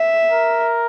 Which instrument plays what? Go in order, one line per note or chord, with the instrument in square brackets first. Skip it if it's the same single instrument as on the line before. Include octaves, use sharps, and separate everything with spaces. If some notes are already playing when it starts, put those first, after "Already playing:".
Already playing: [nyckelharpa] E5
[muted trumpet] A#4